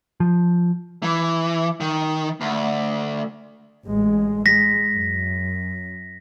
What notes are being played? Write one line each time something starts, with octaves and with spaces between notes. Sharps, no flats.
F3
E3
D#3
D2
A1 G#3
G#3 A#6 B6
F#2